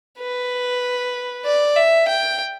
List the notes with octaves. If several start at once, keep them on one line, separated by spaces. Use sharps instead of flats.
B4
D5
E5
G5